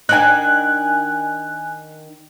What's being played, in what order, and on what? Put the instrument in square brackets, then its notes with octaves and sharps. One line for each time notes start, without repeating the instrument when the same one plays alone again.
[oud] D#3 D4 D#4 [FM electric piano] G#5 F#6